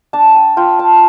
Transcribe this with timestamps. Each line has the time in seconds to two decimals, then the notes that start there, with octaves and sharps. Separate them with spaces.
0.13 D4 A5
0.35 G5
0.57 F4 G5
0.79 A5